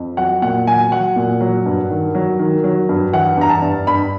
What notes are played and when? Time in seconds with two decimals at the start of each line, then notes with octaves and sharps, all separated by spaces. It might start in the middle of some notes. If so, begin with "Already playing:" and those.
Already playing: F2
0.17 F#3 F#5
0.42 A#2 F#5
0.67 F#3 G#5
0.92 F#3 F#5
1.16 A#2
1.41 F#3
1.66 G2
1.90 D#3
2.15 F#3
2.39 D#3
2.64 F#3
2.89 G2
3.13 E3 F#5
3.37 G2 A#5
3.50 A5
3.62 G2
3.87 G2 B5